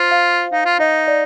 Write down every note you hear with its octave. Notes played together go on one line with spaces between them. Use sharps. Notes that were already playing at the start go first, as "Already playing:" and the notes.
Already playing: F4 C5
F5
D#4 F5
F4
D#4 D#5
D5